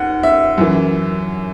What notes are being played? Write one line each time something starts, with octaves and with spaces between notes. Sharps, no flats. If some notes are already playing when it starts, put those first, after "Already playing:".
Already playing: D#2 F#5
E5
F#2 E3